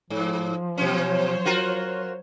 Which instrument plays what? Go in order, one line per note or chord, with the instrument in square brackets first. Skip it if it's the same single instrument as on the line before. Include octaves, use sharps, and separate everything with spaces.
[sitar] G#2 [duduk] F3
[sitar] B2 C#4 [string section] F#3 C5 C#5
[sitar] F4 F#4 A#4